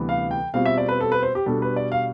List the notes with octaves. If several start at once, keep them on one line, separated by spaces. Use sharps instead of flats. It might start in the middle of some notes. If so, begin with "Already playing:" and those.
Already playing: D2 C3 E3 G3 B3
F5
G5
B2 G3 C4 F4 F5
E5
D5
B4
A4
B4
C5
G4
B2 G3 D4 A4
B4
D5
F5